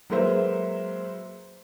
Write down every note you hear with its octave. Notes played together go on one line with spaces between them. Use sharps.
F#3 G#3 A#3 B4 C5 E5